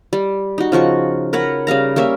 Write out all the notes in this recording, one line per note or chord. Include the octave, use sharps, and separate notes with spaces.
G3
D#4 F#4
C#3 F3 F#4 C#6
A#4 B4 C#5 F#5
C#3 G3 F5 A#5
G3 A#3 C#4 E5